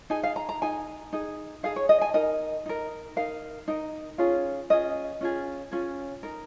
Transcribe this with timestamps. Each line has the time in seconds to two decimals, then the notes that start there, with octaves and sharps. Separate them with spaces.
0.10 D#4 G#4 G#5
0.23 F5
0.36 A#5
0.49 A#5
0.62 D#4 G#4 G#5
1.13 D#4 G#4
1.63 D#4 G#4 F5
1.76 C#5
1.89 D#5
2.01 G#5
2.14 D#4 A#4 D#5
2.66 D#4 A#4
3.16 D#4 A#4 F5
3.68 D#4 A#4
4.18 C#4 F4 G#4
4.70 C#4 F4 G#4 D#5
5.21 C#4 F4 G#4
5.71 C#4 F4 G#4
6.23 D#4 A#4